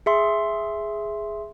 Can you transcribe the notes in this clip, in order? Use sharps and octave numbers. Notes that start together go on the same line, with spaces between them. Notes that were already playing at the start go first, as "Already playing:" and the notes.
G#4 E5 C6